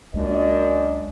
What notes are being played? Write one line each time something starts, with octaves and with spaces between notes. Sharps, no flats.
C#2 F#2 G#3 A#3 D4 D#5